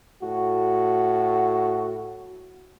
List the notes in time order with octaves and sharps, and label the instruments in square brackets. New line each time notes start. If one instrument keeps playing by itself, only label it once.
[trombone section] A2 F#4